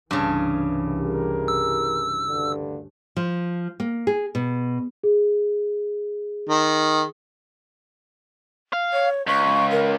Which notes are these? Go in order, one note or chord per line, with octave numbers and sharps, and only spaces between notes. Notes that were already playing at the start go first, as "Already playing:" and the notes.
C2 G2 C#3 E3
G4 G#4 A#4
E6
D2 G2 D3
F3
A#3
G#4
B2
G#4
D#3
F5
C#5
C#2 C#6
A#4